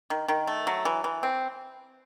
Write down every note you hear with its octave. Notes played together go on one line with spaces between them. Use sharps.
D#3
D#3
A3
F#3
E3
E3
C4